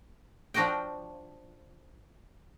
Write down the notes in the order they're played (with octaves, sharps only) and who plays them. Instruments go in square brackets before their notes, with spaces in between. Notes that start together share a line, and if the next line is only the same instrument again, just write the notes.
[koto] F3 D4 F#4 D#5 G5